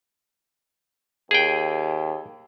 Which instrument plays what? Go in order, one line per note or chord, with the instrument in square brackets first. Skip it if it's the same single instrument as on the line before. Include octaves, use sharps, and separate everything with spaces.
[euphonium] D#2 [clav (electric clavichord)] G#4 G5